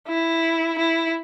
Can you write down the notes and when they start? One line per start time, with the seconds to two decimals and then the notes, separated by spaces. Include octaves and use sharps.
0.08 E4
0.79 E4